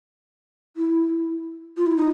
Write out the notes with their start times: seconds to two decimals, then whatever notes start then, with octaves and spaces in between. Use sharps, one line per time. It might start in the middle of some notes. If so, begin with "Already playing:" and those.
0.77 E4
1.77 F4
1.86 E4
1.97 D#4